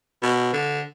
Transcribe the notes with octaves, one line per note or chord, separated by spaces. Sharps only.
B2
D3